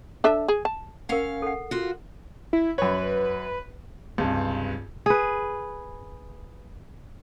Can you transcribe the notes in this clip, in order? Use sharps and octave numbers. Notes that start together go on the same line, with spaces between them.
D4 A4 E5
G#4
A5
C#4 A#4 F5 F#5
A4 F#5
F4 F#4
E4
F#2 B4 C#5
C#2 G2 C3
G#4 B4